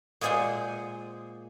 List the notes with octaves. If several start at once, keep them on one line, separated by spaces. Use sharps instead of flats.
A#2 G#3 G#4 C5 F#5 G#5